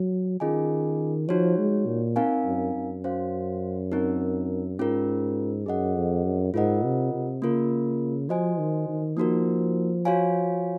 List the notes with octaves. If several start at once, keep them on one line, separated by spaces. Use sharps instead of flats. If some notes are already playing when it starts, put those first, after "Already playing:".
Already playing: F#3
D#3 C#4 F4 G#4 D#5 G#5
F3 D#4 F#4 C#5
G#3
A#2
C4 D#4 A#4 F5 G#5
F#2
F#2
C#4 F#4 C5 F5
C4 D#4 A#4
G#2 C#4 F4 A#4
F#2 G#4 D#5 F#5
F2
F#2
G#2 F4 A#4 D#5 F#5
C3
C3
C#3 A#3 F4 A#4
F3 F#4 C5 D#5 G#5
D#3
D#3
F3 A#3 D#4 F#4 A#4
F#4 C#5 F5 G#5